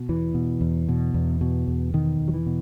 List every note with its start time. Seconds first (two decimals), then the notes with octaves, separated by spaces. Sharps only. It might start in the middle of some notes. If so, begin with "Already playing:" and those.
Already playing: B2
0.09 E2 E3
0.34 B2
0.61 E2
0.88 B2
1.14 E2
1.41 B2
1.67 E2
1.94 B2 D#3
2.21 E2
2.28 F#3
2.34 E3
2.46 B2